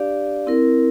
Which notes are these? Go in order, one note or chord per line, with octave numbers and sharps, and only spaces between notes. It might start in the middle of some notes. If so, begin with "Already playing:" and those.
Already playing: D4 G4 D5 F5
C4 E4 A#4